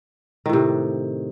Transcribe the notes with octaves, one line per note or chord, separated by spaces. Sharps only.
A2 C3 D#3